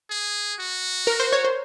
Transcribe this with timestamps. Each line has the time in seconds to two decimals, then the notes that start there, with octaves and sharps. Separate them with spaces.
0.10 G#4
0.60 F#4
1.07 A#4
1.20 C5
1.32 C#5
1.44 C5